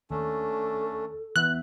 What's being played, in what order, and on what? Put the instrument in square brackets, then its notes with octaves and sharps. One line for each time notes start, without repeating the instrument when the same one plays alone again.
[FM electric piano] D#2 [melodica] A3 C#4 D4 [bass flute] A4
[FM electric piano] E2 B3 E5 [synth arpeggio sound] F#6